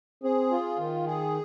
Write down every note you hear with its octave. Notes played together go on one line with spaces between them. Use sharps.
C4 G#4
F4
D#3
G#4